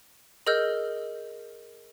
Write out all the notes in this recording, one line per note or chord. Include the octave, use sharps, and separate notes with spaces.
G#4 A#4 D#5 E6 F6 G6